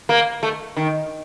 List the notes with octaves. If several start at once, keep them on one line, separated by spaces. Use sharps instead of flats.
A#3
A3
D#3